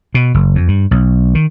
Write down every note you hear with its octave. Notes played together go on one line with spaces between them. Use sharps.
B2
F#1
F2
G2
B1
D#3